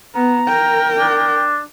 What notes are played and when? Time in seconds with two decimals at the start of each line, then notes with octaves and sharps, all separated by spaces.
0.15 B3 A#5
0.48 A#4 G5
0.98 D4